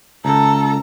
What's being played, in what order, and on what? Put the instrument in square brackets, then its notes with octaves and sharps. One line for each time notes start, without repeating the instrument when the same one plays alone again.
[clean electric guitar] C#2 [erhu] A4 [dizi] A#5